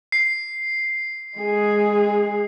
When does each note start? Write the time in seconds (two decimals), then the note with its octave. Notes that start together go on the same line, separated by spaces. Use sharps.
0.12 C7
1.38 G#3 G#4